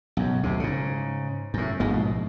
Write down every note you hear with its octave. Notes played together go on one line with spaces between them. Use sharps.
B1 F#2
D2 C3
G#2 C#3
F#2 A2
A#1 G#2 B2 G#3